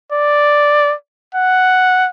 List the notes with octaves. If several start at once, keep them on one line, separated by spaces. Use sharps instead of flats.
D5
F#5